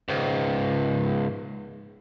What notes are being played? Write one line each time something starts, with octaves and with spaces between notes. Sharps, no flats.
C#2 G#2